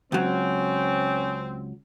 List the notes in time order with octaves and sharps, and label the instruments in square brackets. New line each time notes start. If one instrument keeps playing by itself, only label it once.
[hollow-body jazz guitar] C#2 F#3 [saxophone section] C4 [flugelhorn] C#4